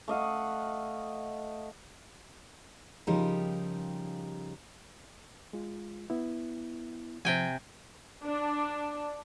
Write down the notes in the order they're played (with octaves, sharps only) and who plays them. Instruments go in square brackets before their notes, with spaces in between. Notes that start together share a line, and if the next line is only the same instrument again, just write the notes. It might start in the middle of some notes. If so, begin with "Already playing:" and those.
[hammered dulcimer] A3 D#5 F5 F#5
[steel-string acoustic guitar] C#3 F3 G3 D#4 G4 A#4
[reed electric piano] G#3 F4
B3 E4
[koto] C3 G5 G#5 [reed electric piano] F3
[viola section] D4